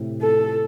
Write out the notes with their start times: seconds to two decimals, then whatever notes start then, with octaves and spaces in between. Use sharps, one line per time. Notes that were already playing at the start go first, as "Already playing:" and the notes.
Already playing: A2 C3
0.22 A4